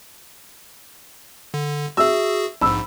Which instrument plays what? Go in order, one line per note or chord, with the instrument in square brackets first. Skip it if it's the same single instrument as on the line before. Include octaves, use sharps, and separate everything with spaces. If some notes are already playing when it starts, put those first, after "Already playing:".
[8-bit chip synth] D3
[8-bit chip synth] F#4 G#4 [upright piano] E5 E6
[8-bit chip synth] A#1 G#2 [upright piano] B5 E6